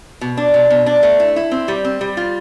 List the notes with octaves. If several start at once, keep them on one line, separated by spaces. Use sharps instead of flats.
B2
D4
B2
B2
D4
A3
E4
E4
C4
G3
C4
G3
F4